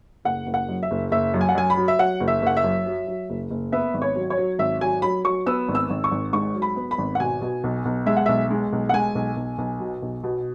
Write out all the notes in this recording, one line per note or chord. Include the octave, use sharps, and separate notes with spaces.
F#1 F#5
F#1
F#5
F#2
E5
F#1
F#1 E5
F#2
G#5
F#5
F#2 G#5
B5
F#3
E5
F#3 F#5
F#1
E5
F#1 F#5
E5
F#2
F#3
F#3
F#1
F#1
B3 E5
G#1
C#5
F#3
C#5
F#3
G#1 E5
F#3 G#5
F#3 B5
F#3 C#6
B3 E6
G#1
E6
G#1
C#6
G#1
G#2 C#6
F#3
B5
B3
B5
G#1
F#5
B2 G#5
B2
B1
B1
G#3 E5
F#5
B1 E5
G#3
B1
F#5
G#3 G#5
B1
B1
B1
B2
B1
B2